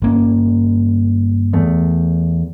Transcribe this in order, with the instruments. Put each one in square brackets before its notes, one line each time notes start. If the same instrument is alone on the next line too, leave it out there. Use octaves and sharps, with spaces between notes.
[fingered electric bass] G1 A#3 C#4
[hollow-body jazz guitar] E2 A3